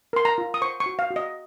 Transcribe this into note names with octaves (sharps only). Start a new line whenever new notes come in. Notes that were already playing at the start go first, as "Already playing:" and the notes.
A#4 C6
A#5
F4
D#6
C5 C#6
C#6
F#4
F5
F#4
D#5